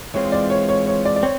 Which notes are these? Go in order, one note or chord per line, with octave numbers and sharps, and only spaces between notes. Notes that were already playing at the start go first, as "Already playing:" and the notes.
E3 G#3 C4 F4 C#5
D5
C#5
C#5
C#5
D5
D5
C4 C#5